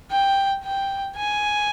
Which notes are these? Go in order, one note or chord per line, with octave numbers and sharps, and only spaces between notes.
G5
G5
G#5